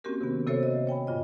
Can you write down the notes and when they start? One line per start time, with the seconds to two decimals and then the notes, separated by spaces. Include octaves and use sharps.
0.04 A#3 C4 C#4 F#4 G4 A#4
0.21 C3 D#3 B3
0.46 C3 F#4 A4 C5 C#5 E5
0.63 D#5
0.87 C#5 G5 G#5 B5
1.07 G2 A#2 F4 D#5